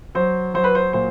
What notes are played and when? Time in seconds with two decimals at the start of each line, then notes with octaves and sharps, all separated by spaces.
0.15 F#3 C5
0.54 F#3 C5
0.64 B4
0.75 C5
0.93 A#2 C5